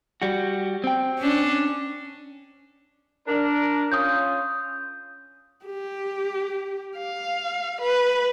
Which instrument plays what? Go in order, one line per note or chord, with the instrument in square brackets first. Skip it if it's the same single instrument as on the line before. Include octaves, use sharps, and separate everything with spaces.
[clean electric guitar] G3 F#4
C4 G5
[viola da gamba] C#4 D4
[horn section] D4 A#4
[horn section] C#4 F4 [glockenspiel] D#6 G6
[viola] G4
F5
B4